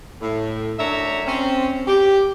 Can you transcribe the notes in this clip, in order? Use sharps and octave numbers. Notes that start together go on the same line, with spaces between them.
A2
F#2 A3 D4 C#5 E5 A#5
C4 C#4
G4